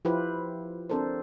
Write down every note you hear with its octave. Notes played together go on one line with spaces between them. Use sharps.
F3 E4 F4 G4 B4 C5
C4 D4 A4 A#4 C5